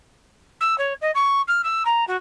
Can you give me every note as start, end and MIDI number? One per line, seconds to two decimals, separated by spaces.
0.60 0.77 88
0.78 0.93 73
1.01 1.11 75
1.14 1.41 85
1.47 1.61 89
1.63 1.83 88
1.85 2.04 82
2.07 2.16 66